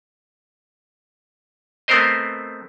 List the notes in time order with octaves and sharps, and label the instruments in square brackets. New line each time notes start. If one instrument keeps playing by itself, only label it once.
[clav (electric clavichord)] A3 B3 C4 A#4 C5 D#5